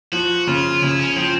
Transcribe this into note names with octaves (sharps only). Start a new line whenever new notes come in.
F3 F#4
C#3 F4
C#3 E4
C#4
F3 C4